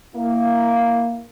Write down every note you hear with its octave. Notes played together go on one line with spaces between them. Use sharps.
A#3 E4